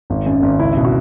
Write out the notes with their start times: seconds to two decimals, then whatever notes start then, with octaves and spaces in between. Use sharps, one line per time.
0.10 G#1
0.26 F#2
0.42 G#1
0.59 C#2 E4
0.77 B2
0.85 F#4